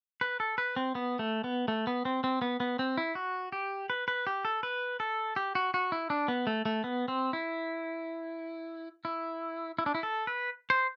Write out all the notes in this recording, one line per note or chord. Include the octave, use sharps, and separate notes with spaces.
B4
A4
B4
C4
B3
A3
B3
A3
B3
C4
C4
B3
B3
C4
E4
F#4
G4
B4
B4
G4
A4
B4
A4
G4
F#4
F#4
E4
D4
B3
A3
A3
B3
C4
E4
E4
E4
D4
E4
A4
B4
C5